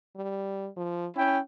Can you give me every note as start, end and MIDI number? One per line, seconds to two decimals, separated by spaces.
0.16 0.68 55
0.77 1.07 53
1.16 1.40 61
1.16 1.38 64
1.16 1.38 79